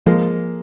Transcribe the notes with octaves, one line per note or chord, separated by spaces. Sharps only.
F3 G#3 A#3